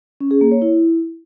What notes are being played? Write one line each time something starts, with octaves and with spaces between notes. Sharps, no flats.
C#4
G#4
A#3
C#5
E4